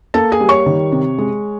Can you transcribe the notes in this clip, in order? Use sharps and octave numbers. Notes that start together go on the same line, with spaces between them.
A#3 A4 A5
G#4 G#5
G3
C#5 C#6
D#3
C3
G#3